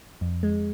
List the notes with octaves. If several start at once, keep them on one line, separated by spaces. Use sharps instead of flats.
F2
G#3